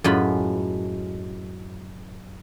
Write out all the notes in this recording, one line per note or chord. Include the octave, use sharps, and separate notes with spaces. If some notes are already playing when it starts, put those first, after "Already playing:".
F#2 A2 G#3 F4 B4 B5